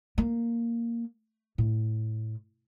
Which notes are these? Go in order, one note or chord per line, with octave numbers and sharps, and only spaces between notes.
A#3
A2